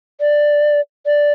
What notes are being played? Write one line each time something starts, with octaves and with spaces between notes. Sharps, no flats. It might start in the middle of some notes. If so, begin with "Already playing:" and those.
D5
D5